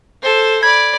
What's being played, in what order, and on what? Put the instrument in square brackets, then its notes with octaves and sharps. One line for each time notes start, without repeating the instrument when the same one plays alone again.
[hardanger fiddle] A4 C5
[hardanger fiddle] D5 B5 [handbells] G#6